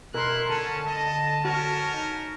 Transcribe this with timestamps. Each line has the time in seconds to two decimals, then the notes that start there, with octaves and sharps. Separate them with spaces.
0.14 B2 E4 A#4 C6 F#6
0.49 D3 C#4 A5
0.87 D#5
1.45 C#4 F#4 A#4
1.94 D#4